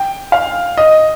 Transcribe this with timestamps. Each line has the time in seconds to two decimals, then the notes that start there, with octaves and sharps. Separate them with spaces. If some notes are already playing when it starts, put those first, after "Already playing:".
Already playing: G5
0.32 F5
0.78 D#5